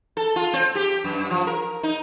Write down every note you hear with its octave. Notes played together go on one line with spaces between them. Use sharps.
A4
F4
C4
G4
F#2
F3
A#4
D#4